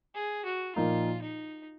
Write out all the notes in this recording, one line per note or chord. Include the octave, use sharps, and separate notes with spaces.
G#4
F#4
A#2 F3 A#3 D#4 F4
D#4